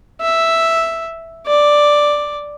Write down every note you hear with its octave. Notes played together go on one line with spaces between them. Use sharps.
E5
D5